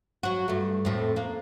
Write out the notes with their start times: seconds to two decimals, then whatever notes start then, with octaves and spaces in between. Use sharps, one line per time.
0.23 F#3 F#4
0.48 G2 A3
0.85 F2 A2 A3
1.16 A#3 D4